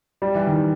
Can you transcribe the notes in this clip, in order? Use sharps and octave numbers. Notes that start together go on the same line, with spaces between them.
G3
E3
D#3